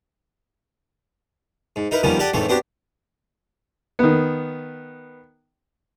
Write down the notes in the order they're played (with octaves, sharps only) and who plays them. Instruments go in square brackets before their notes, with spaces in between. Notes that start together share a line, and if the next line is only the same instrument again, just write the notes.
[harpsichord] G#2
D#4 E4 A#4 B4
D#3 F3 G3 A#3 B3 C#4
G4 A4 D5 F#5 G#5
A1 E2 G#2 A3 C4 C#5
B3 C4 D4 F#4 G4 C5
[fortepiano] D#3 B3